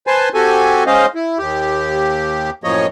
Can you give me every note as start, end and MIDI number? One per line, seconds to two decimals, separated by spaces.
0.07 0.29 71
0.07 0.29 72
0.07 0.29 80
0.07 0.29 81
0.07 0.29 84
0.34 0.84 60
0.34 0.84 66
0.34 0.84 67
0.34 0.84 69
0.34 0.84 80
0.86 1.06 56
0.86 1.06 61
0.86 1.06 72
0.86 1.06 75
0.86 1.06 77
1.15 1.38 64
1.38 2.50 39
1.38 2.50 67
2.64 2.87 42
2.64 2.87 45
2.64 2.87 53
2.64 2.87 58
2.64 2.87 73
2.64 2.87 75